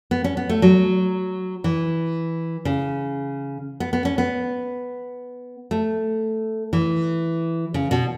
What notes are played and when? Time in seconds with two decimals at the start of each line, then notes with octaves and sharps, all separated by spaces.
0.11 B3
0.24 C#4
0.37 B3
0.49 A3
0.62 F#3
1.64 E3
2.65 C#3
3.80 B3
3.93 B3
4.05 C#4
4.18 B3
5.71 A3
6.73 E3
7.74 C#3
7.91 B2